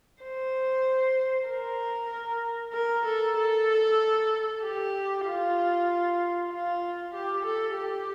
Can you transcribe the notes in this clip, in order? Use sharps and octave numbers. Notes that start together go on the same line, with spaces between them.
C5
A#4
A#4
A4
A4
G4
F4
F4
G4
A4
G4